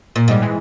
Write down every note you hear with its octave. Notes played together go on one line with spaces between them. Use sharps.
A#2
G#2 G3
E3 G#3